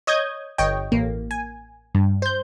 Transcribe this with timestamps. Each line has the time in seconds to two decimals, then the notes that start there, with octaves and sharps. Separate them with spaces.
0.07 C#5 D#5 D#6 G6 G#6
0.58 G1 C#5 D#5 G5
0.92 A1 A#3
1.31 G#5
1.95 G2
2.22 C5 G6